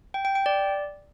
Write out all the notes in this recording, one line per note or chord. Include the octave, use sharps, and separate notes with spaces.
G5
G5
G5
D5